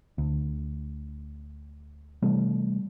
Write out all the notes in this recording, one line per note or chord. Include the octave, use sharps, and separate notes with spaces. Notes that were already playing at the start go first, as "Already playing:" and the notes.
D2
C3 E3 G3 A3